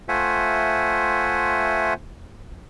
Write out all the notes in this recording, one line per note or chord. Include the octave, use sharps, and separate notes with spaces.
A3 F4 C5 E5 F#5 G#5